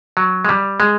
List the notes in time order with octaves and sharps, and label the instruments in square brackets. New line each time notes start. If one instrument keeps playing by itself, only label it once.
[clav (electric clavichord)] F#3
G#3
G3
G#3